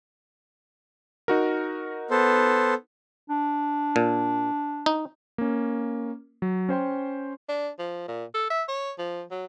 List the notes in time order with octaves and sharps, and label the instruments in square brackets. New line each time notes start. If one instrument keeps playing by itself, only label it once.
[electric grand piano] D#4 F#4 A#4
[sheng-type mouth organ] B3 A4 C5
[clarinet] D4
[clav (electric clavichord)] A#2
D#4
[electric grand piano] A#3 C#4
F#3
C#4 C5 G5 C6
[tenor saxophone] D4
F3
A#2
A4
E5
C#5
F3
F#3